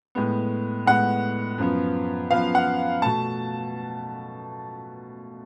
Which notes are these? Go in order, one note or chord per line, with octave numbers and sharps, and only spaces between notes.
A2 G#3 B3
A2 G#3 B3 F#5
F#2 F3 B3
F#2 F3 B3 F5
F#5
B2 A3 A5